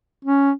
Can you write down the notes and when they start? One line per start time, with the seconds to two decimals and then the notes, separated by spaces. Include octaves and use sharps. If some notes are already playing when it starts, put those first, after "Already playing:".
0.25 C#4